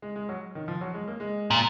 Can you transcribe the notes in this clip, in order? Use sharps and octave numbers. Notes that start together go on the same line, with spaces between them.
G#3
G#3
F#3
D#3
F3
F#3
G#3
A#3
G#3
A#2